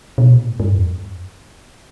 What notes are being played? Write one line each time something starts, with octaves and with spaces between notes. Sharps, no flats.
B2
A#2
G#2
G#2
G2
F2